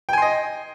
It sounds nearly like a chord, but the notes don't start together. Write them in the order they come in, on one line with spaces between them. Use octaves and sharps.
G5 G#5 C6 D#5